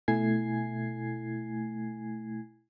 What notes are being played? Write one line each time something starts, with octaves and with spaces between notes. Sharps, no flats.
B2 A3 E4 G#5 G#6 C7